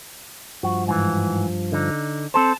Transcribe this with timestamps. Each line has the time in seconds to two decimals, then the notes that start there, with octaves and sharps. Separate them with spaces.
0.63 G2 F3 F#4
0.88 G#2 E3
1.72 D3 D#4
2.34 C4 A4 C5 A5